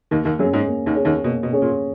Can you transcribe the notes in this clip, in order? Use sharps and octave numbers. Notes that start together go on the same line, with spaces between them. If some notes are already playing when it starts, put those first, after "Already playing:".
D#2 D#3 A#3
D#2 D#3
F#2 F#3 C#4 G#4 C#5
G#2 G#3
A#3
D#2 D#3
C#4 G#4 C#5
D#2 D#3
B2 A#3
B2
C#4 G#4 C#5
A#2